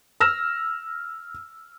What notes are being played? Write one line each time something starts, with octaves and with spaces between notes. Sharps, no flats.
E6 F6 A#6 E7